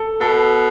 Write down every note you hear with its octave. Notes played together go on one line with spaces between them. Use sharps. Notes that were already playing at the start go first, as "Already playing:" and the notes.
Already playing: A4
B2 A4